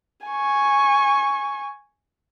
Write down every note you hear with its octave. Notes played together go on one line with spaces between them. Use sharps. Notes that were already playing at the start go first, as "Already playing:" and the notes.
G#5 C#6